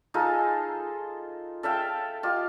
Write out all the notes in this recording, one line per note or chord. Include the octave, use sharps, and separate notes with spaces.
D#4 F4 G#4 A4
A4 E5 F5 G5
F4 G4 D#5